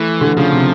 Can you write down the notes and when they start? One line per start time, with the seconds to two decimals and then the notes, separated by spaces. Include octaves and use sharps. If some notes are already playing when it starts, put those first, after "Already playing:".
Already playing: E3 A3
0.21 D3
0.37 C#3 F3
0.52 C3